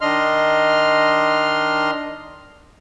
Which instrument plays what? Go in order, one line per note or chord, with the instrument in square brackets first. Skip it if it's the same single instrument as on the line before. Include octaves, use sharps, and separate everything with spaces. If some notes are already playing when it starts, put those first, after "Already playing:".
[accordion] D#3 D4 D#5 C6 F6